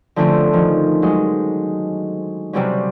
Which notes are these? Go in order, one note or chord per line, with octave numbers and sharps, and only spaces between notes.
D3 F3 A3 C4 C#4
D#3 F3
F#3 G#3
C3 F#3 G3 C4 C#4